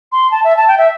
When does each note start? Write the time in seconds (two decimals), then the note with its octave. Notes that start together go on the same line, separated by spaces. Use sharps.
0.12 C6
0.31 A5
0.44 E5
0.57 A5
0.68 G5
0.78 E5